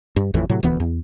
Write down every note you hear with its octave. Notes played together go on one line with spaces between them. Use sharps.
G2
A1 F2 A2 E3
A2 C3 F#3
E1 D2 E3 B3
E2